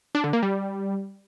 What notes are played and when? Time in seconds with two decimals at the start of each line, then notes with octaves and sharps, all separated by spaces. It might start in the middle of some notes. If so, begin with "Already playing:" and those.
0.15 D4
0.24 D3
0.33 A#3
0.43 G3